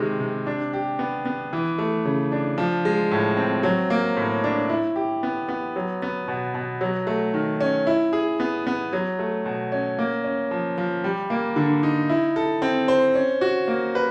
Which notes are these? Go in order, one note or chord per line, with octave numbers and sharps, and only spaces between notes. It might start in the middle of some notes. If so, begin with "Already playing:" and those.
Already playing: C3 D#3 G#3
C3
D4
G4
B3
B3
E3
A3
C#3
D4
F3
G#3
A2
C4
F#3
A#3
A2
D4
E4
G4
B3
B3
F#3
B3
B2
B2
F#3
A3
D#3
C#4
E4
G#4
B3
B3
F#3
A3
B2
C#4
A#3
C#4
F3
F3
G3
A#3
D3
D#4
E4
A4
C4
C5
C#4
F#4
A#3
B4